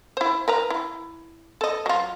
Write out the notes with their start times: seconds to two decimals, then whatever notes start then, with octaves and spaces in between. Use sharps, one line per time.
0.17 E4 C5
0.48 A#4 B4 A#5
0.70 E4
1.61 A4 D#5
1.86 F#3 F4